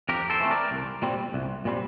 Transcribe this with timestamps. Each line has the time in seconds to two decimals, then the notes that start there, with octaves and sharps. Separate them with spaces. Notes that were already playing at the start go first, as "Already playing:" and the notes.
0.09 F2 G4 A#4
0.30 A4 C5
0.40 E3 A3 C4
0.51 A#4 D5
0.71 C2
1.02 A#2 G3 C4
1.34 C2
1.65 A#2 G3 C4